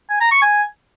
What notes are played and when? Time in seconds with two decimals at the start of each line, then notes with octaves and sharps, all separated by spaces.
0.10 G#5
0.21 A#5
0.31 C#6
0.42 G#5